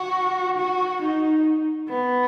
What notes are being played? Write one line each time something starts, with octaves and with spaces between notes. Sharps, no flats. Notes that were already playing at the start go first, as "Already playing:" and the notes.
Already playing: F#4
F#4
D#4
B3